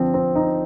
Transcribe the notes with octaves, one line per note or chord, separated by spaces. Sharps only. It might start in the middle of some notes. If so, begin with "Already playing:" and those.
Already playing: D3 F3 C4
C4
D#4